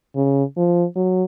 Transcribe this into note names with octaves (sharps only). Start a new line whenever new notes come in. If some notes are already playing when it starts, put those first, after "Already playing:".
C#3
F3
F#3